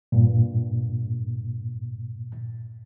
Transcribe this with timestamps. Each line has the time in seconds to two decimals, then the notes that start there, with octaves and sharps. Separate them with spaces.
0.12 G2 A#2